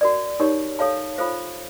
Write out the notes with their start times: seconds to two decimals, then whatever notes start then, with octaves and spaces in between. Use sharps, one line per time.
0.01 F#4 A#4 D5
0.40 D#4 G4 A#4 C#5
0.79 A4 C#5 F5 A5
1.18 F4 A4 C5 F5